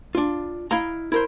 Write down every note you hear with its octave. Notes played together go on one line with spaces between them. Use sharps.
D4 F4
E4 D#5 F5 A#5
E4 A#4 C5